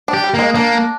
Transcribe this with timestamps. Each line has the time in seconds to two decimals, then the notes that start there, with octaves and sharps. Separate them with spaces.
0.08 D4
0.14 G4
0.24 G3
0.34 G#3 A#3
0.55 A#3 D4